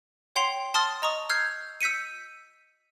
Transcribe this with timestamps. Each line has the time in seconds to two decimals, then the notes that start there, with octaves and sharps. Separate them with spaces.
0.36 C#5 F#5 G5 C6 C7 F7
0.74 A5 C6 D#6 F6 A6
1.02 D#5 A#5 C#6 D#6
1.29 E6 F6 G6 G#6 C7
1.81 E6 G6 B6 C#7 D#7